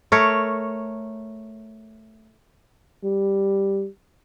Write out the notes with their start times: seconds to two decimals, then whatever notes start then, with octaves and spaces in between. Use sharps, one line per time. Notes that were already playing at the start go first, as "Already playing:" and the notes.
0.12 A3 A#4 C#5
3.04 G3